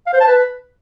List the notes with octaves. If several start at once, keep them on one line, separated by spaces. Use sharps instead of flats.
F5
C5
A5
B4